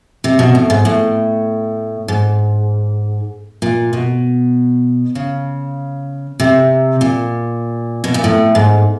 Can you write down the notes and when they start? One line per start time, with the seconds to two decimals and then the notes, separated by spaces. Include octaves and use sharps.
0.24 C3
0.39 B2
0.55 A2
0.70 G#2
0.85 A2
2.08 G#2
3.62 A#2
3.93 B2
5.15 C#3
6.40 C3
7.01 A#2
8.04 B2
8.14 A#2
8.24 A2
8.55 G#2